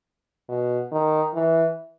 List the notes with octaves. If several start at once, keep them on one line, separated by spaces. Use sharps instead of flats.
B2
D#3
E3